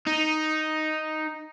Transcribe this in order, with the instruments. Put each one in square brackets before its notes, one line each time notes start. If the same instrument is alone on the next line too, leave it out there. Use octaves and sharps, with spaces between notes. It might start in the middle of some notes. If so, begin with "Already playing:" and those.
[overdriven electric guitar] D#4